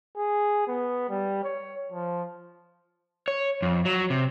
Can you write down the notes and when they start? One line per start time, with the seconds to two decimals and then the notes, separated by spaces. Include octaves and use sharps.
0.17 G#4
0.67 B3
1.10 G3
1.44 C#5
1.92 F3
3.28 C#5
3.62 F2
3.85 F#3
4.10 C3